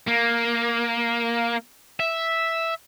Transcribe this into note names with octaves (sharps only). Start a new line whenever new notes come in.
A#3
E5